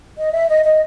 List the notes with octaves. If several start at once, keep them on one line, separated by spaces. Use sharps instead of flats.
D#5
E5
D#5
D#5